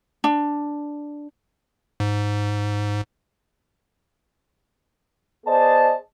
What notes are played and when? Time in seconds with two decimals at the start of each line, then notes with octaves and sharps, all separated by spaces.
0.24 D4
2.00 G#2
5.46 B3 G#4 C5 D5 D#5 A5